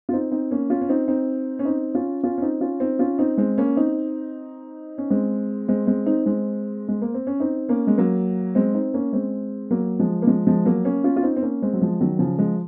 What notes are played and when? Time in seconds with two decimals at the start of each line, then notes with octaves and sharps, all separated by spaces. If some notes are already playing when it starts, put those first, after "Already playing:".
0.09 F4
0.13 C4 D#4
0.31 C4 D#4
0.51 A#3 C#4
0.70 C#4 F4
0.81 C#4
0.89 C4 D#4
1.08 C4 D#4
1.59 C#4
1.65 C4 D#4
1.95 C#4 F4
2.24 C#4 F4
2.38 C#4
2.42 C4 D#4
2.61 C#4 F4
2.80 C4 D#4
2.99 C#4 F4
3.19 C4 D#4
3.38 G#3 C4
3.58 A#3 C#4
3.76 C4 D#4
4.98 C#4
5.10 G#3 C4
5.68 G#3 C4
5.87 G#3 C4
6.06 C4 D#4
6.26 G#3 C4
6.88 G#3
7.02 A#3
7.14 C4
7.27 C#4
7.40 C4 D#4
7.69 A#3 C#4
7.87 G#3
7.98 F#3 A#3
8.55 G#3 C4
8.74 C4 D#4
8.94 A#3 C#4
9.13 G#3 C4
9.71 F#3 A#3
9.99 F3 G#3
10.22 A#3
10.27 F3 G#3
10.47 F3 G#3
10.65 F#3 A#3
10.85 A#3 C#4
11.04 C#4 F4
11.16 F4
11.23 C4 D#4
11.36 C4
11.42 A#3 C#4
11.62 G#3 C4
11.73 F#3
11.81 F3 G#3
12.01 D#3 F#3
12.19 C#3 F3
12.38 F3 G#3